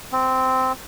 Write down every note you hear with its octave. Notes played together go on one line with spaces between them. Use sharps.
C4